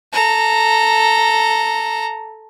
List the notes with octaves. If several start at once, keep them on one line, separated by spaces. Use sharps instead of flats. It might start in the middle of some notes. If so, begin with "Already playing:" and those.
A4 A#5